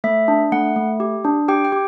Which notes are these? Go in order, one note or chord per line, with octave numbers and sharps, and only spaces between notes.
A3 E5
D4
A3 F#5
A3
G4
D4
G4 G5
G5
G4